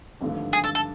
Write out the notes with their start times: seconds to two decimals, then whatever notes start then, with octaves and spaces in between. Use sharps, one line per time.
0.21 G#1 G2 D3 F3 A3
0.53 G#4
0.64 A4
0.75 A4